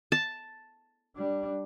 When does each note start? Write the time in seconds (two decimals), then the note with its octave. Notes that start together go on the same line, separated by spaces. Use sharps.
0.12 A5
1.16 G3 D4